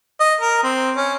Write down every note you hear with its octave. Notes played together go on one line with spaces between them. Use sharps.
D#5
A#4
C4
C#4